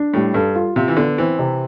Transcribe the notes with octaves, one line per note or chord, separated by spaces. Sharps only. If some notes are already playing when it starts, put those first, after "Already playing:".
Already playing: D4
A2 G3
G2 A4
F4
C3 F4
E3
D3 B3
E3 C4
C3